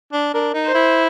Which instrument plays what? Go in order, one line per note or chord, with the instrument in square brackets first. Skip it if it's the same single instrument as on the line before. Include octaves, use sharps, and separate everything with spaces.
[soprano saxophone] D4
[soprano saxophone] D4 [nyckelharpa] A#4
[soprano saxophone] D#4
[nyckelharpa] C5
[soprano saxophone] E4